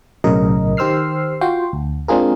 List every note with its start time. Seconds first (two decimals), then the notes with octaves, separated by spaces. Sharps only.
0.24 B1 A2 C#3 F#3 A#4 D#5
0.77 D#3 G4 C5 E6 F6 C7
1.41 F4 F#4 G5 C6
1.73 D2
2.08 G#3 C4 D4 F4 G#4 A#4